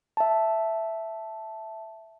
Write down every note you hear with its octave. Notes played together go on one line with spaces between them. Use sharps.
E5 A5